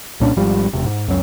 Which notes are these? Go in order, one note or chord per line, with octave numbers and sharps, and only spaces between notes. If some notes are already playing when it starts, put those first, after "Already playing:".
C2 A#2 C#4 D4
G#1 G#2 F3 G3
E1 C3
G#2
C#2 F#2 F#3